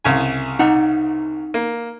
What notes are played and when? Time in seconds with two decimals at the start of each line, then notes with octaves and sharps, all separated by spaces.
0.04 C2 C#3 G#5
0.59 D#4 F#5
1.54 A#3